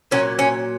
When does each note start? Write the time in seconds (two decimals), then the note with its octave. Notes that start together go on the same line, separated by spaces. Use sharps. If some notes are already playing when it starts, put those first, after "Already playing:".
0.11 A#2 F#3 C#4
0.39 C#4